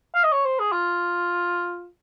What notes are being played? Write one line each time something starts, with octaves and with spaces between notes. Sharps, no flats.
F5
D#5
C#5
C5
G#4
F4